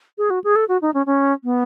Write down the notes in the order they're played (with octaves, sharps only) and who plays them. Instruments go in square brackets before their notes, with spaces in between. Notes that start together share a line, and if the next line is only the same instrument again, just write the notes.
[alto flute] G#4
F#4
G#4
A4
F#4
D#4
C#4
C#4
B3